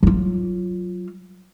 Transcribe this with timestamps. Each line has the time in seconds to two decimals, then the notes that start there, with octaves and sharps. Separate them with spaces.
0.03 F#3 F4